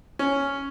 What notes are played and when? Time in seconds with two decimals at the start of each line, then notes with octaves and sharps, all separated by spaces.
0.19 C#4